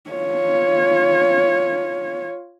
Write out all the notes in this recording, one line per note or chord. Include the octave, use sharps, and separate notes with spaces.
F4 C#5